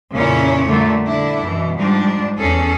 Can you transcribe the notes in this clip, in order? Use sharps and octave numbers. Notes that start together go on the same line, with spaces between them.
F2 A#2 C#3 C#4 E4 C#5
A#2 D3 G3 A3
D3 D4 E4
F#2 B2 E3
G#2 F3 G3 D4
E2 C#4 G#4 A4